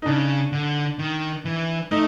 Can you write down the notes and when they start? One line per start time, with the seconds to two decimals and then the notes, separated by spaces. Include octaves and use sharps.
0.02 D#4
0.06 C#3 D4
0.52 D3
0.99 D#3
1.45 E3
1.91 A3 D#4